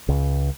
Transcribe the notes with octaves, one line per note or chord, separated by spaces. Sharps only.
C#2